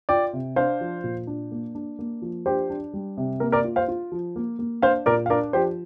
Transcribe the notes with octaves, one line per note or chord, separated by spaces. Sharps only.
F4 D5 G5
C3
D4 C5 F5
F3
A#2
D4
A#3
D4
A#3
F3
D4 G4 C5
D4
G3
C3
A#3 A#4
A#4 D5
F4
C5 F5
F4
F3
A#3
A#3
D4 C5 F5
A#2 A#4 D5
F5
D4 A#4 D5
F3 G4 C5